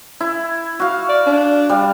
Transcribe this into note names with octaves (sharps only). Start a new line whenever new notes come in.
E4
F#4 F5
D5
D4
G3 F5